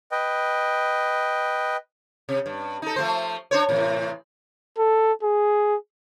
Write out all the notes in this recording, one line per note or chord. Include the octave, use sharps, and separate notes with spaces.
B4 D#5 G5
C3
G2
D#4 A4
F3 A3 C5
D4 C5 C#5
A2 C3 E3
A4
G#4